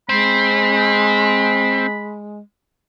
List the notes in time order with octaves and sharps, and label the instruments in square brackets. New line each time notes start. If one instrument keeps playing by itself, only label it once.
[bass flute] G#3 [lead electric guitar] C4 [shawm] B5